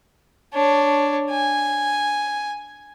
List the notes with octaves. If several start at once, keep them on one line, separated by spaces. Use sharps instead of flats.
D4 C#5
G#5